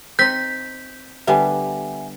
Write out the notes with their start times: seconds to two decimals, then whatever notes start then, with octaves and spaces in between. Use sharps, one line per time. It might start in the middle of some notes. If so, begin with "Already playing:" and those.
0.19 C4 D#4 G6 B6
1.27 D3 G3 B3 E5 F#5 G#5